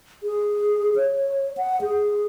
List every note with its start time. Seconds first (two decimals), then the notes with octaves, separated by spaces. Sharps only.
0.23 G#4
0.96 C#5
1.57 F#5
1.81 G#4